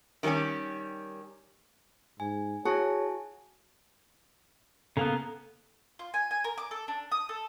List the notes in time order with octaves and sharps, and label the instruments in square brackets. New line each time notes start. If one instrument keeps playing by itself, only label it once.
[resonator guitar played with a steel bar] D#3 G3 A3 C#4 G4
[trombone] G#2 [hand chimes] G#5
[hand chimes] E4 G#5 A5 [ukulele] F#4 [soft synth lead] G#4 [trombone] C#5
[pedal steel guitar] C#3 A#3 B3 [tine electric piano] A4 A#5
[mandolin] F4
G#5
G#5
A#4
D6
A4
D4
D#6
A4